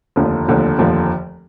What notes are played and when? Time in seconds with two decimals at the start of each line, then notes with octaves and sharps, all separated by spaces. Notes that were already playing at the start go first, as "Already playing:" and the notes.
0.16 F1 D#2 D3 F3
0.48 F1 D#2 D3 F3
0.78 F1 D#2 D3 F3